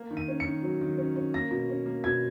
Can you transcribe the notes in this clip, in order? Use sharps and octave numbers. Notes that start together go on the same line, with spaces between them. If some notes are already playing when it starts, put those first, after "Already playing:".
Already playing: A#3
D#3
D#7
C#4
C#7
D#3
F#3
D#3
C#4
C#4
A#3 A#6
B2
C#4
A#3
B2 G#6